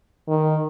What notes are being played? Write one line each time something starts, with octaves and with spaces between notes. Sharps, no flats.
D#3